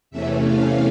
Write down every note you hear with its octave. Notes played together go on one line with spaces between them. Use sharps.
E2 C3 E3 A3 C#4 E5
F5